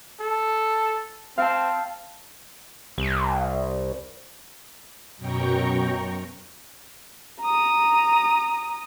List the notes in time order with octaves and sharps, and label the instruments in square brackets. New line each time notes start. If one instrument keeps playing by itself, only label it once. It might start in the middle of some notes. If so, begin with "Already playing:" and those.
[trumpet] A4
[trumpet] C4 [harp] F5 A5
[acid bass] C2
[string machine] F#2 B2 G5 A#5 C#6
[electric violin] A#5 D#6